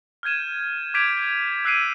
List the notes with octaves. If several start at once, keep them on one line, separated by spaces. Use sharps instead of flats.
F6 G6 G#6 D#7 E7
D6 G6 G#6 B6 D7 F7
E6 F#6 B6 C7 D7 D#7